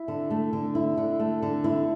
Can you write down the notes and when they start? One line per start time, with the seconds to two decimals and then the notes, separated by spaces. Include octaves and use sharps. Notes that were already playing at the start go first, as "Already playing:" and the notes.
Already playing: E4
0.08 D3
0.30 A3
0.53 D3
0.75 E4
0.97 D3
1.20 A3
1.42 D3
1.64 E4